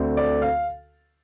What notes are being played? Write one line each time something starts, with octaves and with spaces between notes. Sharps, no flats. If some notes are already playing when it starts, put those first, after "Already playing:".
Already playing: D2 D3 A3 C4
D5
F5